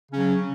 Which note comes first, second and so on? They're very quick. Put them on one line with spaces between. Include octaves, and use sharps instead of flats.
C#3 C#4 F#3